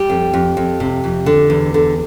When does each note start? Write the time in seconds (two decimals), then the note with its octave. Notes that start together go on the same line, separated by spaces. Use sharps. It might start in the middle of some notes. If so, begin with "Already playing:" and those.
Already playing: G3 G4
0.10 F2
0.34 F2
0.57 F2
0.80 C3
1.04 F2
1.26 D3
1.50 E2
1.74 D3